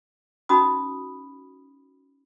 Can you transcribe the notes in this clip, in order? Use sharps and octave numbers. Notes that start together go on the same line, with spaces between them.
C#4 D#4 F#4 B5 D#6